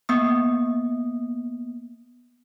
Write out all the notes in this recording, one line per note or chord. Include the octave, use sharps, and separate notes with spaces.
A#3 B3 D#6